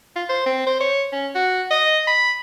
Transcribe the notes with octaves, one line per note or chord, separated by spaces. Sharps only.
F4
C5
C4
C5
C#5
C#4
F#4
D#5
B5